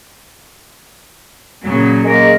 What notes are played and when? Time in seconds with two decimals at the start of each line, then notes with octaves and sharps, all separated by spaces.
1.65 A#2 C#3 F#3
2.05 G#3 A#3 A#4